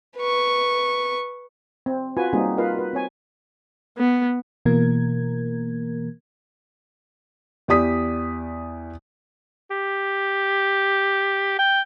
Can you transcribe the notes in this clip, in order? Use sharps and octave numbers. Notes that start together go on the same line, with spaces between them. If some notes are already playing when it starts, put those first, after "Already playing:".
B4 C#6
C4
F4 F#4 B4 G#5
G3 A#3 C4 D#4 F#4 G#4
F4 A#4 B4 D#5 F5
F#4 B4
C4 C#5 G#5
B3
B2 E3 A#3 A#4 G#6
E2 G4 D5 D#6 B6
G4
G5